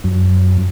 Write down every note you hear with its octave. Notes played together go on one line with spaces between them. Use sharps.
F#2